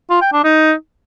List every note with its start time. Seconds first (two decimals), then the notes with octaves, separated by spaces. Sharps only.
0.10 F4
0.21 G5
0.33 D4
0.44 D#4